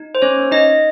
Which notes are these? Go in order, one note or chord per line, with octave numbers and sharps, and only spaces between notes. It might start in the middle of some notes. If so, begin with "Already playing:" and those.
Already playing: D#4
C5
C#4 C#5
A#3
D#4 D#5